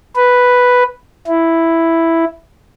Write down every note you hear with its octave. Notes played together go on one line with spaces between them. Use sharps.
B4
E4